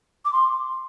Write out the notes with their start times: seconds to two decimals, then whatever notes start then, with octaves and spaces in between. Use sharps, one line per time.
0.25 D6
0.33 C6